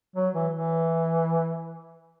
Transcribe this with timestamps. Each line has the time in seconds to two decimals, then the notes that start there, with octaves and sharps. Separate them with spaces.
0.16 F#3
0.34 E3
0.52 E3